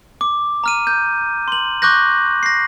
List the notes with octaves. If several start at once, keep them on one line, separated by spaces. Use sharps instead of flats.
D6
A#5 F6 D#7
G6
C6 F#7
C#6 D6 F#6 G6 A#6
A#6 C7